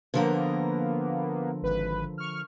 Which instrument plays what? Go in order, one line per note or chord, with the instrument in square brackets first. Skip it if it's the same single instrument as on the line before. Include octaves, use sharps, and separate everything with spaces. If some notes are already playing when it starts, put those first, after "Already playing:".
[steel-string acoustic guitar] D3 F3 A#4 [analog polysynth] A#3 B3
[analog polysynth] G#1 B4
C#6 F6